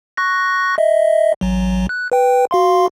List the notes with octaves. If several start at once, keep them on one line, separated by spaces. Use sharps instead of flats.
C#6 F#6 A#6
D#5 E5
A1 F#3
F#6
B4 G5
F#4 F5 C6